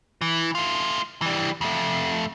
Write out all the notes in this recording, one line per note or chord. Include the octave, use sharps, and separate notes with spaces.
E3
A3 F4
E3 G3
F2 A3